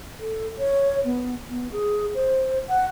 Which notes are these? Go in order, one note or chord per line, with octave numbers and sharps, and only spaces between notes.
A4
C#5
B3
B3
G#4
C5
F#5